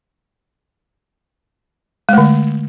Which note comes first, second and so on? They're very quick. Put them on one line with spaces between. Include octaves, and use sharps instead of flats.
G#3 A3 D3